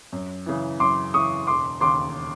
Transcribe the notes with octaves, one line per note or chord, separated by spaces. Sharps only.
F#2
C#3 E3
F#2 C6 D6
C#3 E3 C#6 D#6
E1 C6 D6
D#2 C#3 C6 D6